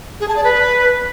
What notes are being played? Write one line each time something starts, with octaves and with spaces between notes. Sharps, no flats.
G#4
A5
D5
B4